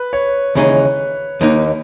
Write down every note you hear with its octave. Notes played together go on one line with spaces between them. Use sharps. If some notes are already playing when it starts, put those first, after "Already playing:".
Already playing: B4
C#5
D#2 C#3 E3 G#3 D#4 C#5
D#2 D#3 A#3 D#4